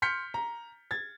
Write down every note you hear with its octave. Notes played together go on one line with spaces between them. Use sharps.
C6 F6 G6 B6 C#7
A#5
G#6 A6